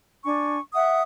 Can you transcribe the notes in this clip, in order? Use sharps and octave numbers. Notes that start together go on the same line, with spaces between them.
D4 G#5 C#6
E5 F#5 D#6